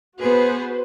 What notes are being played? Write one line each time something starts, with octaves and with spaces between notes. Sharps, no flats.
B3 F#4 G#4 B4 C5